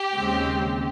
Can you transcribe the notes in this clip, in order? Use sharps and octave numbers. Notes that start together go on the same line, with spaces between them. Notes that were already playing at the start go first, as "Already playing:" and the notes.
Already playing: G4
D#2 C#3 G#3 C4